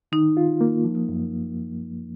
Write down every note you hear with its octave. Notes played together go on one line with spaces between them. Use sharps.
D#3 D#4
F4
A#3
F3
F#2